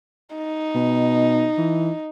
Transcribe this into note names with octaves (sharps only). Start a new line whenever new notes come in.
D#4
B2
E3